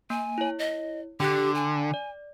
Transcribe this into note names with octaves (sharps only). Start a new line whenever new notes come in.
A#3 G#5
E4 C#5
D#5
D3 G4 G5 F#6
G#5
D5